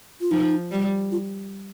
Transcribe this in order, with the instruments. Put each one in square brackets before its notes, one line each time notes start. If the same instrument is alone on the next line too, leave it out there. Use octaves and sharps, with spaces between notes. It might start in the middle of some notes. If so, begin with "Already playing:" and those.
[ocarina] F4
[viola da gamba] F3 [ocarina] D#4
[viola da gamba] G3
[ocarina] F4